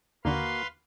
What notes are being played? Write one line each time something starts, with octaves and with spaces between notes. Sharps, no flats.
D#2 D3 A#3 F#4 B4 F5 C6